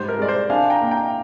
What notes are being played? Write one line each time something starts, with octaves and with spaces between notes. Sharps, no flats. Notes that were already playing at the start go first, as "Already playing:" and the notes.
Already playing: G#2 G3 C5
A#4
G#3 D5
C5
D4 F5 G#5
G5 A#5
A#3
G5 A#5